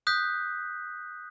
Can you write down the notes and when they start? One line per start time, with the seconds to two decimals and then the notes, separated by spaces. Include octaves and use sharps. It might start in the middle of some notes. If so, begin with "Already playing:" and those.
0.07 D#6 F#6 G6 B6